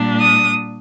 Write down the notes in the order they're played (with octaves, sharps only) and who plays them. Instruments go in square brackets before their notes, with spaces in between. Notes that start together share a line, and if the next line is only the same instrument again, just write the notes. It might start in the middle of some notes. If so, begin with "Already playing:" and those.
Already playing: [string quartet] A#2 G3 D4
D#6